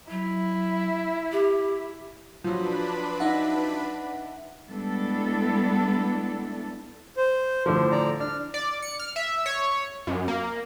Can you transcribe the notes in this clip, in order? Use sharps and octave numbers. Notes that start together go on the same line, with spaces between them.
F#3 E4
G4
F3 F#3 D4 B4 B5
D#4 E5 F#5
G3 G#3 B3 D4 E4 A4
C5
A2 D3 F3
D5 A#5
D4 F6
D5
C#7
F6
E5
C#5
F#2
A#3